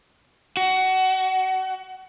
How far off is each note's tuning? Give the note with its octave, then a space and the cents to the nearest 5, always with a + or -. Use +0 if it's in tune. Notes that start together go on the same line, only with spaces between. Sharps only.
F#4 +25